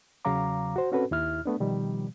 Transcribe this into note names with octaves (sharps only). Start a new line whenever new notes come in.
E2 C#3 F#3 F5 A#5 D6
F#4 C5
C4 C#4 F#4 A4 B4
D#2 E4 F6
A3 B3 D4
B2 D#3 F3 G3